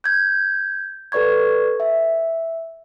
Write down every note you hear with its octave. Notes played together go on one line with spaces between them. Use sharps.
G6 G#6
A4 B4 D5 C#6 G#6
E5